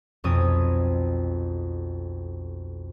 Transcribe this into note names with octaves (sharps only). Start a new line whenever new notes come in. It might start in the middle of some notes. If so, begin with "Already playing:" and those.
B1 F2 C4 G#5 D#6